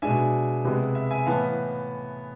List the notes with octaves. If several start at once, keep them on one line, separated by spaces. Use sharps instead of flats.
B2 G#3 D4 E5 G#5
C3 G#3 B3 E4
E5
E5 G#5
A2 E3 B3 F5 A5